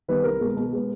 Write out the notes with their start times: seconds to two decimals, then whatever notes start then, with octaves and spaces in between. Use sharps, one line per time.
0.08 D#3 G3 B3 B4
0.24 C2 A#4
0.40 B2 G#3
0.57 B2
0.73 G#3 B3